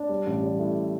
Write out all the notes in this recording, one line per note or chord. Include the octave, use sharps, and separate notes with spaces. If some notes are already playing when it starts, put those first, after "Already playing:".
Already playing: D4
G3
A1
G3
A2